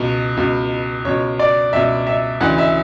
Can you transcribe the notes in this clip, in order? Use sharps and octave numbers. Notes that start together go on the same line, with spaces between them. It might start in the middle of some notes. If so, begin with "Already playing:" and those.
Already playing: C#2 B2
C#2 B2
C#2 B2 C#5
D5
C#2 B2 E5
E5
D2 C#3 E3 F#5
E5